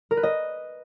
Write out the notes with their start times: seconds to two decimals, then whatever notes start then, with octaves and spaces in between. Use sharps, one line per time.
0.11 A#4
0.17 B4
0.23 D#5